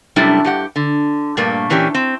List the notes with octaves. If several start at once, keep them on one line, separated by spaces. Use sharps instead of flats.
F#2 C3 G3 A3 D4 E4
G2 G4 F#5
D3
G2 A#2 A3 A#3
A#2 E3 C#4 D4 G4
C4